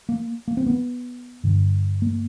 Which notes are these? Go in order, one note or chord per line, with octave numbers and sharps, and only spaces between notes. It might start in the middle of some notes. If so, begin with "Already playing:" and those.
A#3
A#3
C4
B3
G2 D3
A#3